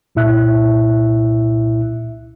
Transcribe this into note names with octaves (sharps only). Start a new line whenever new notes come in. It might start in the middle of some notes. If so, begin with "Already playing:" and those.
C2 A#2 E4 E5 F#6